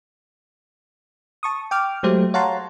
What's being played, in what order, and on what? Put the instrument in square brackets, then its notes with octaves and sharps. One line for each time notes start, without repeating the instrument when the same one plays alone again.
[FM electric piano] A5 C#6 D#6
G5 D6 F6
F#3 G#3 A3 G4 C5
C#5 F5 F#5 A5 A#5 C6